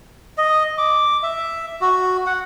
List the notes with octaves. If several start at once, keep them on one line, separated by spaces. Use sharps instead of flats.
D#5
D6
E5
F#4
F#5